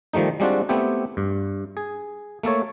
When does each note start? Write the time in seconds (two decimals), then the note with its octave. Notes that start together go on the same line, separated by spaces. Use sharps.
0.13 D#3 F3 G3 A3 D#4
0.40 G3 G#3 C4 D4 F4 F#4
0.69 A3 B3 C4 E4 G4
1.17 G2
1.77 G#4
2.43 A3 A#3 A4 C#5